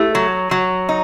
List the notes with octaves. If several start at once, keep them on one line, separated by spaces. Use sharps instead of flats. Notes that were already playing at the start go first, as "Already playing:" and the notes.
Already playing: A3 E4 G4
F#3
F#3
D#4